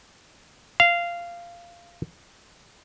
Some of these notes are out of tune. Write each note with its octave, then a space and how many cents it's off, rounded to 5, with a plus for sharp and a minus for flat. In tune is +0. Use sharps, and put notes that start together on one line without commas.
F5 -15